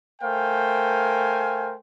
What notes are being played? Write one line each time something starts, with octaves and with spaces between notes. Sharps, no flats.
A3 A#4 C5 F5 G5 G#5